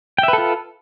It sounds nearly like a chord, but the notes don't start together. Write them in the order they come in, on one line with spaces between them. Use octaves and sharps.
G5 E5 B4 A4 F4